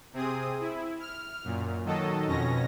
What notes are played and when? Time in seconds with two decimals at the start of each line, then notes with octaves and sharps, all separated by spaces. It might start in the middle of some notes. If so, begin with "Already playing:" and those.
0.13 C3 C4 G#4 D#6
0.60 E4
1.00 F6
1.44 F#2 A#2
1.85 D#3 F#3 A4 D#5
2.27 F2 B2 C#4 A#6